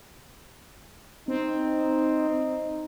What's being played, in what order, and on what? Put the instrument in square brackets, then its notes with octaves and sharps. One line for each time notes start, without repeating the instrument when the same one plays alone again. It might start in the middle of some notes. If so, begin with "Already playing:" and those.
[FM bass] C4 [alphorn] D#4